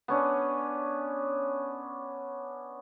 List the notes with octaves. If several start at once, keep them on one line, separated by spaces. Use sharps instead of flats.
B3 C#4 D4